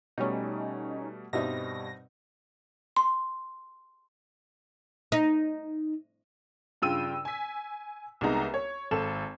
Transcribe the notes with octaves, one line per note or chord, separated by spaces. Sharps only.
B2 G3 A3 C#4 D#4
G2 B2 G3 C4 D#4 E5 A#6
C6
D#4
G2 C#3 F4 G5 E6 D#7
G#5 B6
C2 G#3 B3 D#4 A#5
C#5
G#1 A4 E7